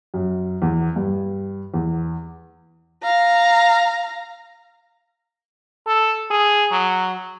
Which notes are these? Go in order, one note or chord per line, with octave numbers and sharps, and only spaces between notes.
F#2
E2
G2
E2
F5 A#5
A4
G#4
F#3